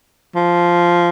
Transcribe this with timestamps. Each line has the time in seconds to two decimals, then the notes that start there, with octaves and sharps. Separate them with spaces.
0.36 F3